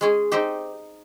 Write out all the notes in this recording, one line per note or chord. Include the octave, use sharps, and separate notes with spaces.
G#3 C#4 G#4
C4 D#4 G4 C5 D#5